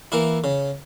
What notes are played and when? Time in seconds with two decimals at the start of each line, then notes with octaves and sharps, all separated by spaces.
0.12 E3 A#3 E4
0.44 C#3